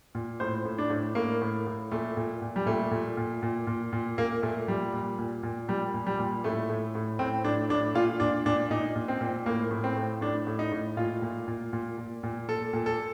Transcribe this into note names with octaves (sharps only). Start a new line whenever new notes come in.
A#2
A2 C5
A2
D4
A2
A2 A#3
A2
A2
A#2 A3
A#2
A#2
G3
A#2 A3
A#2
A#2
A#2
A#2
A#2
A#2 A#3
A#2 A3
A#2 G3
A#2
A#2
A#2
A#2 G3
A#2
G3
A#2
A2 A3
A2
A2
A2 C4
A2 D4
A2 D4
A#2 F4
A#2 D4
A#2 D4
A#2 D#4
A#2
C4
A#2
A2 A#3
A2
C4
A2
A2 D4
A2
D#4
A2
A#2 F4
A#2
A#2
A#2
A#2
A#2
A#2 A4
A#2
A4